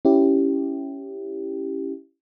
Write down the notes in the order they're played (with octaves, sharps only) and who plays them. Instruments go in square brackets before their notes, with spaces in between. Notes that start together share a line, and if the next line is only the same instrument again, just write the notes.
[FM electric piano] C#4 E4 G4